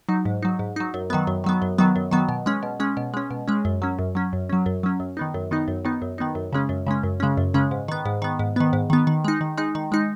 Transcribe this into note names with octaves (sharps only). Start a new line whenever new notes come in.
F#3 D#4
G#2
F#3 D#4
G#2
F#3 D#4
F#2
D#3 F#3 B3
F#2
D#3 F#3 B3
F#2
D#3 F#3 B3
F#2
D#3 F#3 B3
B2
G#3 C#4
B2
G#3 C#4
B2
G#3 C#4
B2
G#3 C#4
F#2
F#3 C#4
F#2
F#3 C#4
F#2
F#3 C#4
F#2
F#3 C#4
F#2
D#3 B3 D#4
F#2
D#3 B3 D#4
F#2
D#3 B3 D#4
F#2
D#3 B3 D#4
F#2
C#3 G#3 C#4
F#2
C#3 G#3 C#4
F#2
C#3 G#3 C#4
F#2
C#3 G#3 C#4
G#2
D#3 B3
G#2
D#3 B3
G#2
D#3 B3
G#2
D#3 B3
D#3
G#3 D#4
D#3
G#3 D#4
D#3
G#3 D#4